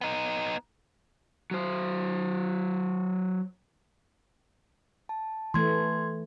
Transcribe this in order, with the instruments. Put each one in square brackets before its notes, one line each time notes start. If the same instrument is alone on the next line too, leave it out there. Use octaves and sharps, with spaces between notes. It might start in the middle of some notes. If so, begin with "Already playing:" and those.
[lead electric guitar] B3 D#4
[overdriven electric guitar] F#3 C5
[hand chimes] A5
[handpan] E3 A3 [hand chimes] C6 G#6